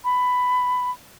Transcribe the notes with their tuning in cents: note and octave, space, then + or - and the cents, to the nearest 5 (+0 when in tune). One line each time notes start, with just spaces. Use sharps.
B5 +10